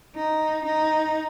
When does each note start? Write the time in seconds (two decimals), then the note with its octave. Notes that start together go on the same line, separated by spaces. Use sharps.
0.16 D#4
0.66 D#4